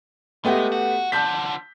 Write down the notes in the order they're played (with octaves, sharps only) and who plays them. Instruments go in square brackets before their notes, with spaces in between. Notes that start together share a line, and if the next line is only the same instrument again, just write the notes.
[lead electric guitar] G#3 [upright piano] A3 B3 G4
[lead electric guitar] F#4
[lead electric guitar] D3 F3 [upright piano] A5 G6 B6